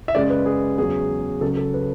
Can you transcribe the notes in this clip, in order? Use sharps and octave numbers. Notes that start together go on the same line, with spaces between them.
E5
F#2 C#3 G#3 D5
B4
G#4
E2 C#3 F#3 G#4
C#2 C#3 F#3 A4
A4
B4